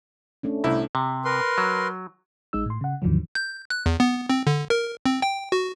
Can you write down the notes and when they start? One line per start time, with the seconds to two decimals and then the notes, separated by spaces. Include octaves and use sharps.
0.43 A3 C#4 D4
0.64 C2 A2 E4
0.95 C3
1.25 A#4 B4 C6
1.58 F#3
2.53 A1 G#3 D#4 E6
2.66 A2 C6
2.81 C#3 F#5
3.02 D#2 G#2 D3 D#3 F3 F#3
3.35 G6
3.70 F#6
3.86 E2
4.00 B3
4.30 C4
4.47 D3
4.70 A#4
5.06 C4
5.22 G5
5.52 F#4